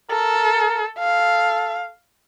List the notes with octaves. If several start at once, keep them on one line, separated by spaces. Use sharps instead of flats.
A4 A#4
A4 F5